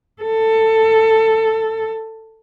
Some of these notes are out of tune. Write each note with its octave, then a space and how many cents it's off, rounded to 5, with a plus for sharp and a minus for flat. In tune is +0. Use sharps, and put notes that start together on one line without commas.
A4 +15